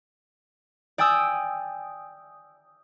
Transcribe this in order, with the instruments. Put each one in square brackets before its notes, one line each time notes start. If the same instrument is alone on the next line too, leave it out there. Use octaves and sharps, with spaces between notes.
[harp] D5 G5 G#5 D#6 E6